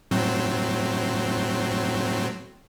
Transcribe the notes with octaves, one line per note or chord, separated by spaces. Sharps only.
A2 F#3 C4